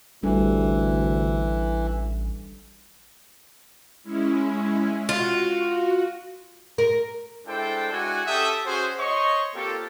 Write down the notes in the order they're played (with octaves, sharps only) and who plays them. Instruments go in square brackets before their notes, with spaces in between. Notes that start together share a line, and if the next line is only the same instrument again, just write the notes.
[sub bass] A1 [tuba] D2 [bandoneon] E3 [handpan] G3 D4 A4
[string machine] G#3 C#4 E4
[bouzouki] F4 [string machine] F#4
[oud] A#4
[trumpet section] G#3 D4 E4 A4 C5 G5
G#3 D4 E4 F#4 F#5 G#5
C#4 G4 A4 E5 G5 D#6
C#4 F#4 G#4 C5
C5 C#5 D#5 C6 C#6
A#3 C4 F4 G4 A4